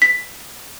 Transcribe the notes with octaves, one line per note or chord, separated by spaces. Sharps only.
B6